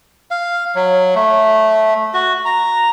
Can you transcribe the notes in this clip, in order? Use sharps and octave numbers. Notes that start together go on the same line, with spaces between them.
F5
F#3
A3
F#4
A#5